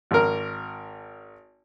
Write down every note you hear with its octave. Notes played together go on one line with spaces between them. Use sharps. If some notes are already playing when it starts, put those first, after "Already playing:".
G#1 A#4